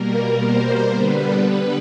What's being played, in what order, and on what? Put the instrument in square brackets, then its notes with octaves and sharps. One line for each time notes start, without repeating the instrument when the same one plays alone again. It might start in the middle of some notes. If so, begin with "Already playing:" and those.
Already playing: [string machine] B2 G3 A#3 A#4
C5
D3 G3 B3 B4